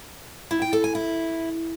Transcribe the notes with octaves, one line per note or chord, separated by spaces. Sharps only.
E4
G5
A4
G#5
E4